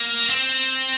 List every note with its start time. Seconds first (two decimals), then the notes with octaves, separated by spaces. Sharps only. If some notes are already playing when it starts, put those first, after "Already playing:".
Already playing: A#3
0.30 C4